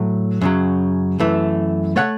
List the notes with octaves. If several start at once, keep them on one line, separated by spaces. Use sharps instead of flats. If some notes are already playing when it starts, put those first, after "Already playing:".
Already playing: A2 F#3 A3
F#2 C#3 F#3
F#2 E3 A3
C#3 A3 C#5 F#5